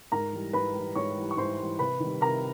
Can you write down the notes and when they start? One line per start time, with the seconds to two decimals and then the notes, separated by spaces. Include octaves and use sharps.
0.12 G#2 A#4 A#5
0.33 E3 G3
0.53 G#2 B4 B5
0.75 E3 G3
0.96 G#2 C#5 C#6
1.17 E3 G3
1.31 C#6
1.37 G#2 C5 C6
1.59 E3 G3
1.79 C3 B4 B5
2.00 D#3 G3
2.21 C3 A#4 A#5